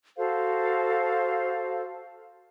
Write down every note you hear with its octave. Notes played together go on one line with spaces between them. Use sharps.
F#4 A4 C5 F5